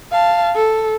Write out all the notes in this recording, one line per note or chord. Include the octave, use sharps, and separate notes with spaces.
F5 A5
A4